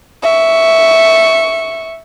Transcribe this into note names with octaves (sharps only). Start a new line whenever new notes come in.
E5 C#6